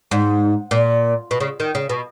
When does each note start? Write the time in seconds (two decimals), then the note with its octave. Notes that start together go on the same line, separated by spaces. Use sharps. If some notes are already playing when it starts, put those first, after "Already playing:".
0.11 G#2
0.71 A#2
1.31 B2
1.40 C#3
1.60 D#3
1.75 C#3
1.89 B2